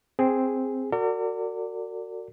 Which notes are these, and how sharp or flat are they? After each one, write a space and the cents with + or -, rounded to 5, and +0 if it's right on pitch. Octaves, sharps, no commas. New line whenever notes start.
C4 +0 G#4 -5
F#4 +0 A#4 -45 D5 -10